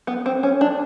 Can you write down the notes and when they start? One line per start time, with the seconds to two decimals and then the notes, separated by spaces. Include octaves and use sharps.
0.07 B3
0.26 C4
0.43 C#4
0.61 D4